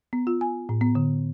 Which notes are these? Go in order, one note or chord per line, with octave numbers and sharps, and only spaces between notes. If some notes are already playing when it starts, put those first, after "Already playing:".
B3
F4
G#5
A2
B3
D3